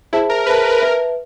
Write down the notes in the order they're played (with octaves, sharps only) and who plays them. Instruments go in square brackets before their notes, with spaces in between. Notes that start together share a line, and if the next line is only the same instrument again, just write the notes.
[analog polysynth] E4 [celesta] G#4 C5 E5 A5
[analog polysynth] A#4
[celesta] G#4 C5 E5 A5 [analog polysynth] B4
[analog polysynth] B4
A#4
[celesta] B4 E5 A5